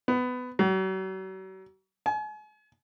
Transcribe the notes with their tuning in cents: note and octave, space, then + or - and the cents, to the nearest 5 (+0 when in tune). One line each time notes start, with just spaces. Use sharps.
B3 +20
F#3 +40
G#5 +40